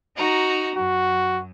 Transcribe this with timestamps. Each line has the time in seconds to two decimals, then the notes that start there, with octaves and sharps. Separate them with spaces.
0.16 D#4 F#4 A#5
0.76 F#2 F#4